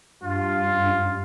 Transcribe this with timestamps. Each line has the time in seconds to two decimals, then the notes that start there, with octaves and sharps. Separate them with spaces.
0.23 G2 F4